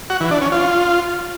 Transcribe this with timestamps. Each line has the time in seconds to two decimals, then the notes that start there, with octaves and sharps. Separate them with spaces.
0.10 F#4
0.20 E3
0.31 D4
0.41 C#4
0.52 F4